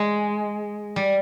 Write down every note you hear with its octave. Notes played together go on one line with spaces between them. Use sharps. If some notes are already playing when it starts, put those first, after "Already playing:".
Already playing: G#3
G3